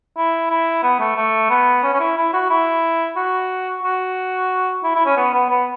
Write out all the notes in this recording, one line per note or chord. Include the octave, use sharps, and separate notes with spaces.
E4
E4
B3
A3
A3
B3
C#4
C#4
E4
E4
F#4
E4
F#4
F#4
E4
E4
C#4
B3
B3
B3